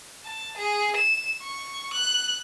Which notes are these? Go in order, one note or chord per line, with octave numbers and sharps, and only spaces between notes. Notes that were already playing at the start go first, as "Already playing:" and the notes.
A5
G#4
E7
C#6
F#6